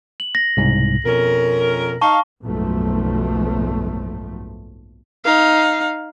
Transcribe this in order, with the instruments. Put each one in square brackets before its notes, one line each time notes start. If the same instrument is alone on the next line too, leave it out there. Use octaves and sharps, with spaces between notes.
[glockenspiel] F#7
A#6
[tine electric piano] C2 G#2 B2
[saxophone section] F2 C#4 A#4 [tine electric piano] B2
[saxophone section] D#4 F5 [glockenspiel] A5 C#6
[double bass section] F#1 B1 G#2 F3 A3
[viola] D#4 F5